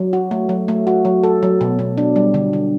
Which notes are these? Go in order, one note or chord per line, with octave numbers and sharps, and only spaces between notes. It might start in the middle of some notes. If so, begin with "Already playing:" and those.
Already playing: F#3
F#4
A3
F#3
A3
F#4
F#3
A4
F#3
B2
B2
D4
G3
D3
D3